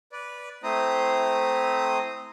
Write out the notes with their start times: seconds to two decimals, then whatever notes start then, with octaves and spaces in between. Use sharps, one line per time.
0.12 B4 D5
0.63 A3 C4 E4 C5 A#5 D#6